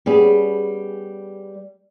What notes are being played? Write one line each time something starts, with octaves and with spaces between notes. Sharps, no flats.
G3 B3 C#4 G#4